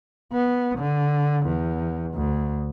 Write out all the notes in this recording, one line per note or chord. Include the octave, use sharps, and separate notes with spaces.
B3
D3
E2
D2